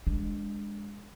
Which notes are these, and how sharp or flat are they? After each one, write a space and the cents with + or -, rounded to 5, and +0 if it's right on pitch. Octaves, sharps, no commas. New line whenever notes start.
G#3 -15 D4 +0